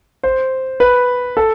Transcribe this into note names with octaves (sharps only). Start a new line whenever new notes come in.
C5
B4
A4